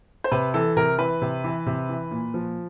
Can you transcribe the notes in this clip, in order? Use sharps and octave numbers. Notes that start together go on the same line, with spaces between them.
C5
C3 B4
E3 A4
C3 A#4
E3 B4
C3
E3
C3
E3
A#2
F3